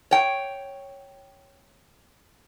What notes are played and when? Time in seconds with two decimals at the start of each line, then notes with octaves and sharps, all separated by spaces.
0.11 C#5 G5